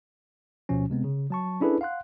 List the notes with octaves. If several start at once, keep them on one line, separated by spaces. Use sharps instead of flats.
D2 B2 F3 C#4
C3 G#3 B3 C4
C#3
F#3 A5 C#6
C#4 D4 E4 G#4 A4 B4
F5 F#5 C6 F#6